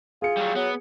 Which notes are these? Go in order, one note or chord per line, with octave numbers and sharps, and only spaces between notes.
F4 G#4 C#7
F#3 G3
F#3 B3